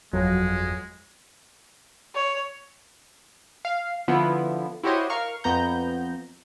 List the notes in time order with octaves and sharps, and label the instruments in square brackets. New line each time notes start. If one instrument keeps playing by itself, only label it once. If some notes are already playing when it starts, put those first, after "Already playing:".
[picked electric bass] G1 F2 [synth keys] F#3 [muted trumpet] G#3
[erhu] C#5
[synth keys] F5
D3 F3 B3 E4
E4 F#4 G4 C5 C#5 D#5
A#4 F5 C#6 F6
F2 B3 A#5 G6